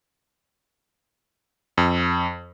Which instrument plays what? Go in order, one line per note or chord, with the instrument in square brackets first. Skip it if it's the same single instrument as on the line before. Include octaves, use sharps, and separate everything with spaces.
[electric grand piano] F2